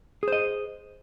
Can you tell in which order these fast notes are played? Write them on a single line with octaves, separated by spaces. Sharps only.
G#4 C5 D#5